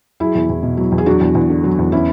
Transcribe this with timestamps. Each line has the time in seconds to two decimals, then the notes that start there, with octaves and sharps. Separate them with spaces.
0.20 F#3 E4 G#4
0.35 E2
0.50 E2
0.63 B2
0.77 F#3
0.92 E2
0.98 G#4
1.06 F#3 D4 F#4
1.21 E2
1.35 E2
1.50 D3
1.64 F#3
1.79 E2
1.92 E3 C#4 E4